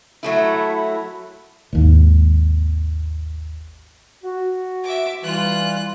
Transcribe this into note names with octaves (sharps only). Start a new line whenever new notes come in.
F#3 A3 E4
G#1 D#2
F#4
E5 D6
E3 G3 F4 F#6